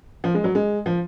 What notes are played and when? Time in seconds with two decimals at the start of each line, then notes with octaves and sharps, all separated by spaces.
0.24 F3
0.34 G#3
0.44 F#3
0.55 G#3
0.86 F3